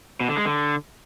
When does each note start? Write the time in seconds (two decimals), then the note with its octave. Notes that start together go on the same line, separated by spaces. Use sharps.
0.20 B2
0.29 D3
0.37 G#3
0.45 D3